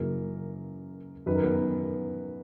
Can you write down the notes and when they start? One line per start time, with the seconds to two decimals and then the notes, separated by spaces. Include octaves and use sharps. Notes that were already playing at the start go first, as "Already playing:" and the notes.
Already playing: F#2 C#3 E3 A#3 A#4
1.26 F#2 D#3 B4
1.35 A#4
1.44 B3 B4